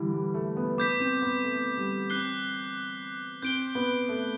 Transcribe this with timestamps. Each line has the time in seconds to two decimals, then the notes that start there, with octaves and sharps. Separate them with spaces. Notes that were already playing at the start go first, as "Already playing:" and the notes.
Already playing: D3 E3 G3
0.12 G3
0.34 A3
0.57 B3
0.78 B3 D6 G6 B6
0.99 C4
1.22 B3
1.44 A3
1.77 G3
2.10 C4 F#6 C7 G7
3.42 C4 G6 D7 G7
3.75 B3
4.09 A3